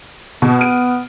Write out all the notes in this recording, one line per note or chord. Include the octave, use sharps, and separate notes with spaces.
B2 B3
F6 D7 D#7